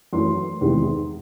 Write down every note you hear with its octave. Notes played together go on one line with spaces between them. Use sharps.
F#2 E3 A3 C6
E2 C3 D#3 G#3